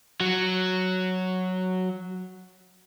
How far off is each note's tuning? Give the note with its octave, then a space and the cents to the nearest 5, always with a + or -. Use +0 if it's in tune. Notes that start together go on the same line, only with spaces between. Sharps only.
F#3 +0 F#4 +0